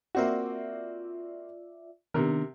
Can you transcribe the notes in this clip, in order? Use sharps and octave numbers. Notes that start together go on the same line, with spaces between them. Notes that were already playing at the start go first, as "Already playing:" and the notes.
A#3 C4 F4 F#4 D5 E5
C3 D#3 B3 D4 A#4